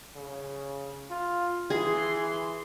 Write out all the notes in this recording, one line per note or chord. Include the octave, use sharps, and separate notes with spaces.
C#3
F4
E3 G#4 C6